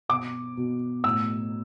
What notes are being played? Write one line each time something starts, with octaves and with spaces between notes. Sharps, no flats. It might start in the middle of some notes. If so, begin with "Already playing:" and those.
B2 D6
B2
A2 E6